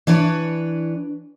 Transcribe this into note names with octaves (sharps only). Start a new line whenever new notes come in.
E3 D4 B4 C#5